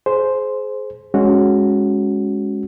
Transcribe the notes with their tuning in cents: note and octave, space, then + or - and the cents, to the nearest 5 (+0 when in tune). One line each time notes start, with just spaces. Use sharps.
G#4 +30 C5 +0
G#3 +0 C#4 +0 F#4 +0